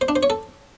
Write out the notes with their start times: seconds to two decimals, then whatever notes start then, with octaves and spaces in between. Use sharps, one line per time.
0.01 C5
0.08 D4
0.16 C5
0.23 C#5
0.30 A4